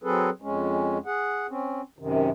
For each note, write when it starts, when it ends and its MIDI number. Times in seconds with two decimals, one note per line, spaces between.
0.03 0.30 54
0.03 0.30 60
0.03 0.30 68
0.03 0.30 69
0.03 0.30 71
0.42 0.98 41
0.42 0.98 56
0.42 0.98 61
1.06 1.47 68
1.06 1.47 78
1.49 1.81 60
1.49 1.81 61
1.99 2.30 42
1.99 2.30 48
1.99 2.30 51